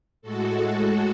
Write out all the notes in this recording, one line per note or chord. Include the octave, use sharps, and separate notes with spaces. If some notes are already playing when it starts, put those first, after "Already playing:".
A2 G#3 F#4 A4